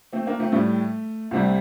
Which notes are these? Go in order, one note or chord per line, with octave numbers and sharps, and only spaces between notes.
A3 C4
A#3 D4
A3 C4
A2 G3 A3
C2 C3 G3 A3